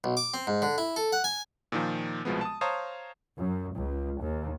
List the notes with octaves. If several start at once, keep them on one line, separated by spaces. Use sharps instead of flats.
B1
D6
C4
G#2
D3
E4
A4
F#5
G#5
A#2 D#3 F3
C2 B2 F3 G#3 B3
A5 D#6
C5 C#5 F5 A5 A#5 D#6
F#2
C#2
D#2